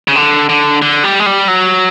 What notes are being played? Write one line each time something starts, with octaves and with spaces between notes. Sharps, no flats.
C#3
D3
D3
D3
G3
G#3
G3
F#3